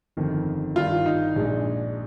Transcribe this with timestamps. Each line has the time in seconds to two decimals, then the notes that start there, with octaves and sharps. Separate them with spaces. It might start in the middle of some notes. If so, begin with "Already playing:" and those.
0.17 G1 F2 D#3
0.76 G2 D#3 G3 F4
1.06 D#4
1.36 A#1 A#2 G#3 D4